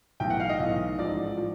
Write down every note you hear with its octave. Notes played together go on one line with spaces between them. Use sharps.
B1 A2 E3 G5
F#5
F5
D#5
B1 A2 E3
A1 G#2 F3 D5
F3